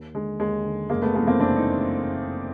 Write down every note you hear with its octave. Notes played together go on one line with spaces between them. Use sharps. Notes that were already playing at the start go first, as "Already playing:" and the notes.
Already playing: D#2
D3 G#3
D#2 G#3
D3
F#1 G#3 A#3
A3 B3
F2 C3 E3 G#3 A#3
A#3 C4
F#1 C4 D4
D#4